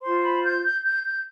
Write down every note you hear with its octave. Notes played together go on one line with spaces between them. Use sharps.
F4 C5 C6
B5
G6
G6
G6
G6